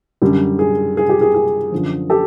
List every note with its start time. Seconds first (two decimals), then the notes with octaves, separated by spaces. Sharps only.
0.22 F#2 D3 G3
0.59 G#4
0.97 G#4
1.09 G4
1.21 G#4
1.34 G#4
1.72 F#2 D3 F3
2.10 G4 A4